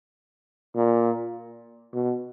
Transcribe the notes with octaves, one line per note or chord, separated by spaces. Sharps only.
A#2
B2